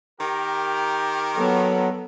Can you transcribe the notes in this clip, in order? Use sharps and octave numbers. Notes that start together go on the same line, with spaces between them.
D#3 G4 A#4
F#3 B3 A4